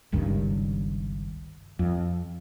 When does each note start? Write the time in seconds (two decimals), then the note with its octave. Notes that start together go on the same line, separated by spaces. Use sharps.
0.12 G1 C#2 G2 D#3
1.79 F2